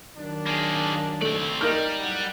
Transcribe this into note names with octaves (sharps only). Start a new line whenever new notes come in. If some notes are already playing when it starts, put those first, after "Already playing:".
D#3 F#3 D4
A#3 G#4
A3 C4 D5
G3 A#3 D#4 F6
F#2 A2 F#5